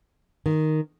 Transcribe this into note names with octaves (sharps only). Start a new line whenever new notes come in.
D#3